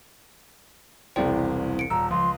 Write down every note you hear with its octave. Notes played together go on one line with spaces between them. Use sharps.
E1 C2 C4 E4 G#4 C5 D5 G5
C#7 D7
D#1 A#5 E6
C#2 F3 C6